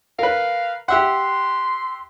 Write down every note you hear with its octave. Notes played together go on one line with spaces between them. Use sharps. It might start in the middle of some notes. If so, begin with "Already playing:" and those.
A#4 B4 F5
G4 E5 F#5 C6